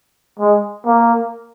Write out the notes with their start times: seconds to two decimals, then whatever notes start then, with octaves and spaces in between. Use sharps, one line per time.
0.39 G#3
0.85 A#3